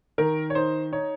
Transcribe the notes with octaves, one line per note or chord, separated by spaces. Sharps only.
D#3 A#4
C#5
D#4 C5
D#4 C#5